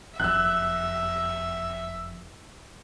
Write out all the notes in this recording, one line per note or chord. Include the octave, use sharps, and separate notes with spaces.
F#1 F2 E5 E6 F#6